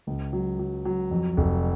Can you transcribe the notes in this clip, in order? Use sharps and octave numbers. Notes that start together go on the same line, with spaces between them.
C#2
F#3
F#3
F#3
F2
F1